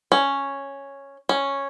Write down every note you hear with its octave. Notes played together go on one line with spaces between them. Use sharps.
C#4
C#4